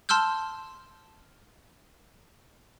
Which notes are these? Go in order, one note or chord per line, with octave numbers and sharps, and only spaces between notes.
A5 C6 E6 F6 G6